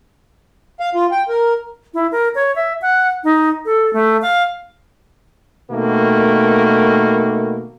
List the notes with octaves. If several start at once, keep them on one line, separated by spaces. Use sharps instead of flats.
F5
F4
G5
A#4
E4
A#4
C#5
E5
F#5
D#4
A4
A3
F5
B2 D#3 A3 A#3